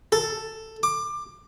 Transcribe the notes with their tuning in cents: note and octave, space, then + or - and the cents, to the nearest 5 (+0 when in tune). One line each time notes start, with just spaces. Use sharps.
A4 +10
D6 +20